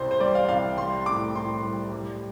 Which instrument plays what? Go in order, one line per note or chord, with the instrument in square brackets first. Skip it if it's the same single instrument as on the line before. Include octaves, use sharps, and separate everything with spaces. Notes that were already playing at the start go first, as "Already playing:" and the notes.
Already playing: [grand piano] C2 C3 C5
C5
G3 D5
F5
C2 F5
G3 C6
A2 D6
A2 C6
G3
G3